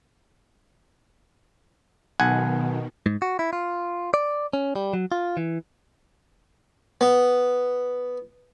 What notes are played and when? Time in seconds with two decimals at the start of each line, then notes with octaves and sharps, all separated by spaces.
2.20 B1 B2 D#3 F#5 G#5
3.06 G#2
3.22 F#4
3.39 E4
3.53 F4
4.14 D5
4.53 C#4
4.76 G3
4.93 F#3
5.12 F4
5.37 E3
7.01 B3